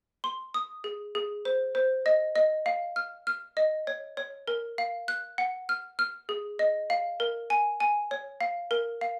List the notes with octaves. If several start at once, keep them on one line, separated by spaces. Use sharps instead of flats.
C6
D#6
G#4
G#4
C5
C5
D#5
D#5
F5
F6
F6
D#5
C#5
C#5
A#4
F5
F#6
F#5
F6
F6
G#4
D#5
F5
A#4
G#5
G#5
C#5
F5
A#4
F5